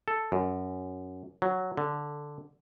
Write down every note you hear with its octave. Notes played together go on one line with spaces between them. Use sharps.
A4
F#2
F#3
D3